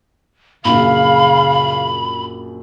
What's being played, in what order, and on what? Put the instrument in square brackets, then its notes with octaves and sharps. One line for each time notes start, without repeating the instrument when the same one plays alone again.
[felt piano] A#1 F#2 [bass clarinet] C#3 [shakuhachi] F5 [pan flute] B5